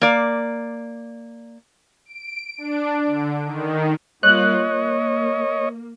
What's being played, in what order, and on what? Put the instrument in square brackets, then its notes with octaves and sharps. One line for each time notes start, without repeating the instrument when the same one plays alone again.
[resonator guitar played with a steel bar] A#3 D5
[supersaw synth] D7
D4
D3
D#3
[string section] G3 A#3 F4 [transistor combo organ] C#5 D#5 [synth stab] F#6
[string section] A#3